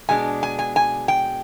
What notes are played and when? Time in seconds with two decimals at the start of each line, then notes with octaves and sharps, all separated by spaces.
0.09 B2 G#3 D4 G#5
0.43 G#5
0.59 G#5
0.76 G#5
1.08 G5